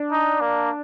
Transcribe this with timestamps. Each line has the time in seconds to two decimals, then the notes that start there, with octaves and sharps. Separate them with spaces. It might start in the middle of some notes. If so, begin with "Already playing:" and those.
Already playing: D4
0.12 D#4
0.41 A#3